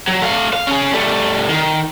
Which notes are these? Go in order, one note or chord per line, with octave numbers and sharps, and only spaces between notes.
F#3
A3 F5
F5
C#4 G#4
G3 A3
D#3